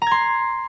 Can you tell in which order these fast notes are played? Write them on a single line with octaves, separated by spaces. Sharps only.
A#5 G#6 C6